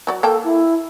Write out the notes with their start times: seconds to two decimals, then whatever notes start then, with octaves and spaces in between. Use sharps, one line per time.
0.07 F#3 F#4 D5
0.23 A#3 A4 G5 A5
0.44 E4